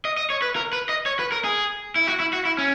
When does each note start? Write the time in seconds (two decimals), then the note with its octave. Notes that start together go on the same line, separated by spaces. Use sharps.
0.05 D#5
0.17 D#5
0.30 C#5
0.42 B4
0.56 A#4
0.73 B4
0.89 D#5
1.06 C#5
1.19 B4
1.32 A#4
1.44 G#4
1.96 E4
2.07 F#4
2.20 E4
2.33 F#4
2.45 E4
2.58 C#4